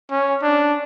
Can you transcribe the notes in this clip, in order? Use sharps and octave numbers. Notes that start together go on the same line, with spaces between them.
C#4
D4